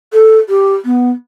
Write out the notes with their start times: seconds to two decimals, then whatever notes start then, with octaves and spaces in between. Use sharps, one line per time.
0.13 A4
0.49 G4
0.85 B3